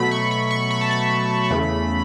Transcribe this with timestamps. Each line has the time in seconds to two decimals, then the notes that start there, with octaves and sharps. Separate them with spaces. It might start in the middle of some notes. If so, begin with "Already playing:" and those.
Already playing: B2 F#3 A3 B5
0.11 C#6
0.31 B5
0.51 C#6
0.71 B5
0.81 A5
0.91 B5
1.50 E2 C#3 E3 A3